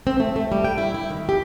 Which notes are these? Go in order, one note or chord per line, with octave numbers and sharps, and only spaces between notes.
C4
A3
A3
G3
G5
E4
E4
D#3
G4